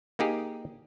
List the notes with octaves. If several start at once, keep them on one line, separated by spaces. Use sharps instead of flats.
A#3 D#4 G4 G#4